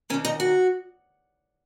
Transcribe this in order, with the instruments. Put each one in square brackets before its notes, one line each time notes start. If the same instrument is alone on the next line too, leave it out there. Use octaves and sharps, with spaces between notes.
[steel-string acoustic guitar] D#3 C#4
D#2
D#4
F#4